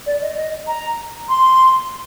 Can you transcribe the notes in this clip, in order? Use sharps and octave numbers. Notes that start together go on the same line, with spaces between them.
D5
D#5
D#5
A#5
C6